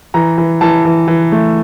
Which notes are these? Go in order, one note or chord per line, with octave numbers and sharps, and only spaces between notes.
E3 A#5
E3
E3 A5
E3
E3
A3